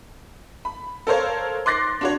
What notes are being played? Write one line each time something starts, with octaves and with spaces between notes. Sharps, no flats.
B5
A4 A#4 C5 C#5 F5
C6 D6 F#6 A6 A#6 C7
D4 F#4 C#5